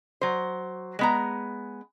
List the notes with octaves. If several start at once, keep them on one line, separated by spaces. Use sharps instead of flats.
F#3 C5
G#3 B3 A#5